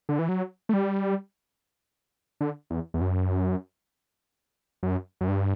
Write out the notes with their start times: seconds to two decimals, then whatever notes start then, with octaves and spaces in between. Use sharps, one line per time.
0.09 D3
0.19 E3
0.29 F#3
0.69 A3
0.73 G3
2.41 D3
2.70 E2
2.94 E2
3.01 F#2
4.83 F#2
5.21 F#2
5.28 G2